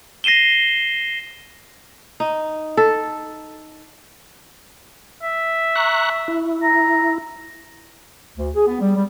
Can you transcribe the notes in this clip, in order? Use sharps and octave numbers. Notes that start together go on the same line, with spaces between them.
A#6 C7 D#7 E7 G7
D#4
A4
E5
A#5 C#6 F#6
E4
A#5
D2
G#4
B3
G3
G3